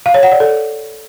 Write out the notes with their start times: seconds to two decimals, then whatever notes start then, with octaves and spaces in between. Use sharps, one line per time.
0.06 F5
0.14 C#5
0.23 F#5
0.32 D5
0.40 A4